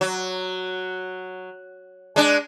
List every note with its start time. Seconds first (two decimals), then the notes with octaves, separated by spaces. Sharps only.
0.01 F#3
2.16 G#3 D4